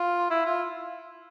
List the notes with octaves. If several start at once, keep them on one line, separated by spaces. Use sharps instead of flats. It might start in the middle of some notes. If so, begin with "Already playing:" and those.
Already playing: F4
E4
F4